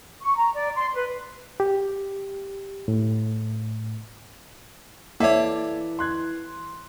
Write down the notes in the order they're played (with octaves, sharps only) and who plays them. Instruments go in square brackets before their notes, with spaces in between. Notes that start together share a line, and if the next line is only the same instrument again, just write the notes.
[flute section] C#6
A#5
D5
C6
B4
[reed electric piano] G4
A2
[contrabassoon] E3 [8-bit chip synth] A#3 C#5 [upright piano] A4 D5 D6 [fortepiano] E5
[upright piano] C6 F#6 G#6